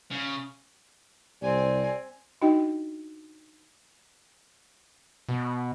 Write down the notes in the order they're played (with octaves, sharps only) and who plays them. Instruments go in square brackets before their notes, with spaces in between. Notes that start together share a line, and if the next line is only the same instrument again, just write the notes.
[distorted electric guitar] C#3
[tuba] C2 [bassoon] G3 [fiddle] C4 G#5
[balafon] D4 D#4 F#4 D#5 G5
[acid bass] B2